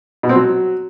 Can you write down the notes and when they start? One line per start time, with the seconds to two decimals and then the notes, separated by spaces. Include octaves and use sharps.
0.23 B2
0.29 C4
0.35 F#3